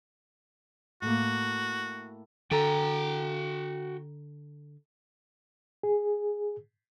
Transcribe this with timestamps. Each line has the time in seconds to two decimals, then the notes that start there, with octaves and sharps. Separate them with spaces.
1.02 A2 A#3 F#4
2.51 D3 F#4 A4 G5 A#5
5.83 G#4